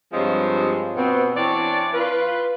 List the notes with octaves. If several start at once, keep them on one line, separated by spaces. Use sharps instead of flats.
G2 F3 G#3 C4 C#5 D#5
B2 B3 C4
E3 C4 D4 C#5 D5
F4 B4